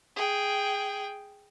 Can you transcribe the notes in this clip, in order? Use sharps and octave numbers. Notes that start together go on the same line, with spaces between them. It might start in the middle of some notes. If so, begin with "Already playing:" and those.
G#4 G5